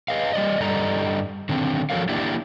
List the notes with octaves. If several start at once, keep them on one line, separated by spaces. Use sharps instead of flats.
G#4 B4 D#5 F5
G3 D5 D#5
G2 G3 A4 D5 D#5 A#5
D3 D#3 C4
F3 F#4 A4 A#4 C#5 F5
A#3 D4 E4 G4 D5 E5